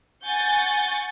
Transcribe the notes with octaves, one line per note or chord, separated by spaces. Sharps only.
F#5 G#5 C#6 G6 A6